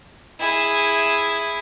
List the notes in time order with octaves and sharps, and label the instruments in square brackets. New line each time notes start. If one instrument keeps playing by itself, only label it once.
[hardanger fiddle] E4 G#4